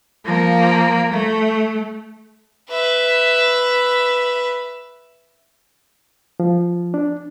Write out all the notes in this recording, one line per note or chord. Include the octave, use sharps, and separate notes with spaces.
F3 A#3
A3
B4 E5
F3
D4